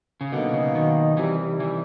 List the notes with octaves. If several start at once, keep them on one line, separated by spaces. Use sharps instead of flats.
C#3
B2 D3 F#3 A#3 D#4
C#3
D#3
C3 D#3 E3 G3
E3